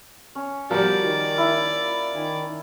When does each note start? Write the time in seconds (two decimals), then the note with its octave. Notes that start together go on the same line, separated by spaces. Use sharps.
0.35 C#4
0.71 F3 G3 F#4 A#4 D5
1.03 D#3
1.38 A#3 E4
1.85 F4
2.15 D#3 G#5